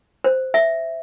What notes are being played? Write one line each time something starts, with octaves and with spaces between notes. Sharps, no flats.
C5
E5